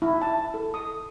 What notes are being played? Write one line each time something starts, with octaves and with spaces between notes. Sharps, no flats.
E4
A5
A4
D#6